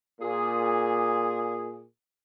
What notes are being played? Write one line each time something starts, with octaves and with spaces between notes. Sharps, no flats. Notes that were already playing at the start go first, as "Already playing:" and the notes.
A#2 G#4